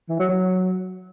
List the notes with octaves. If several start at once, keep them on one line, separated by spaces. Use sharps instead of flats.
E3
F#3
F#3